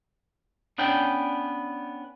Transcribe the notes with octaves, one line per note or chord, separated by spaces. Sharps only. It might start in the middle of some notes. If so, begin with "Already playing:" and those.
B3 C#4 D4 G5